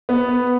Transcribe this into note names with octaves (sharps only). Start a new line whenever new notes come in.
B3